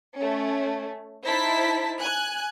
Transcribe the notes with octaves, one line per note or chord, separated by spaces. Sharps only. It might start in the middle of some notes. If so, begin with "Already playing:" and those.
A3 C#4
D#4 E4 C5 A5 B6
G#5 F#6